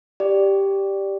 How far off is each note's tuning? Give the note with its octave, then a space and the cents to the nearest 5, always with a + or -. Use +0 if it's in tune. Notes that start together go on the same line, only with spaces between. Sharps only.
G4 +0 D5 +0